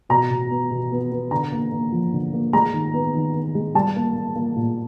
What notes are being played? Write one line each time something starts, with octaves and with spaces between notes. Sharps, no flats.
B2 A#5
B2
B3
B2
B3
B3
D3 A#5
A#3
A#3
F3
D3
A#3
G#3 A#5
D#3
B3
D#3
B3
G#3
G3 A5
A#3
A#3
A#3
A#2